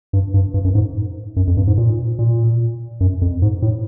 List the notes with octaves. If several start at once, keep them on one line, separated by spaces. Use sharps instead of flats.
G2
G2
G2
F#2
G#2
F#2
F2
G2
G#2
A#2
A#2
F#2
F2
G#2
A2